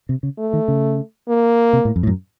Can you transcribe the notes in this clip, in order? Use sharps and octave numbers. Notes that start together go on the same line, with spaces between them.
C3
C#3
A3
D#3
C#3
A#3
C3
A2
F2
A2
F#2